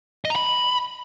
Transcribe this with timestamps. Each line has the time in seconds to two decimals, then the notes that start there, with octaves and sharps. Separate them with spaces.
0.25 D#5
0.30 A#5
0.36 B5